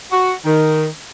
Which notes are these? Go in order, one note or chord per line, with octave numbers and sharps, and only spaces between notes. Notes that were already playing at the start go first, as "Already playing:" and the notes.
F#4
D#3